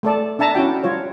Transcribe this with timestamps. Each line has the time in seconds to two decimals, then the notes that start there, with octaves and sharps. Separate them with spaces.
0.03 A3 A4 D5 A5
0.39 D4 E5 A5 A#5
0.55 C#4 E4 F#4 G5
0.84 G3 F4 C#5